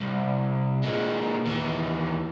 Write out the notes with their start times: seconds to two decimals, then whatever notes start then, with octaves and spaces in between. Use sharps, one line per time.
0.01 C2
0.83 A#2 G#3
1.47 D#2 E3